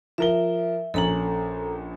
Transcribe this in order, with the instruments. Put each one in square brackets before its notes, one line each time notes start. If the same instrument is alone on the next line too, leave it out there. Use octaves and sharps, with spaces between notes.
[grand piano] F3 A#4 G7 [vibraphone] E5
[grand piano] A#1 C#4 F#7 [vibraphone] A4 A#5